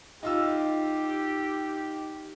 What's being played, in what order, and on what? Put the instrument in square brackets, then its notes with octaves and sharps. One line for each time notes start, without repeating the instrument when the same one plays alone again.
[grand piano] D#4 F4 E6 [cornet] G4